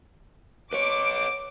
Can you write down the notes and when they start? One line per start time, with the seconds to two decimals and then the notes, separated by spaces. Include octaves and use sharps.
0.73 B4 C#5 D6